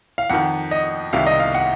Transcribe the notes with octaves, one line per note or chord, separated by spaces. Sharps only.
F5
F2 D#3 F#5
D#5
C2 C3 D#3 F5
D#5
F5
F#5